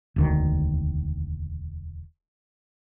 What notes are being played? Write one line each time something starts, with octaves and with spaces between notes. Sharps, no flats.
E1 D2 D#3